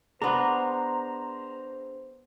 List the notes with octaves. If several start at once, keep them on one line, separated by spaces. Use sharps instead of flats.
B3 D4 G#4 C5 A#5 C6